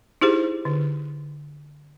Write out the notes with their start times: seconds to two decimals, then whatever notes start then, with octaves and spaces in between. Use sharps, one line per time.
0.21 D#4 E4 G4 G#4 C5
0.65 D3